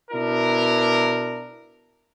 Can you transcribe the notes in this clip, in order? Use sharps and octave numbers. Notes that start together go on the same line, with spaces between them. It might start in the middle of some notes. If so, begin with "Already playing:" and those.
B2 D4 E4 A#4